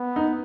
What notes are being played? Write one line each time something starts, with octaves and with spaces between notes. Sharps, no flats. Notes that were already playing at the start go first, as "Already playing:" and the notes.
Already playing: B3
D#4